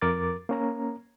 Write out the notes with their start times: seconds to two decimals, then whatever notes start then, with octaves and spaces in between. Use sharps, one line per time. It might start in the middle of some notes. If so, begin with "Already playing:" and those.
0.02 F2 A#4 D6 A6
0.49 A#3 C#4 A#5